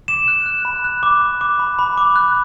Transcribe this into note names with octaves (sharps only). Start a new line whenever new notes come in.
D6 E7
F#6
F#6
B5
F#6
D6
D6
D6
B5
B5
D6
F#6